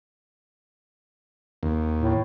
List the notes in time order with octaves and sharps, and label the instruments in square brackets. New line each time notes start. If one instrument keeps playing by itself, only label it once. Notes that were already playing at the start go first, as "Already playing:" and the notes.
[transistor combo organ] D#2
[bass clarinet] A2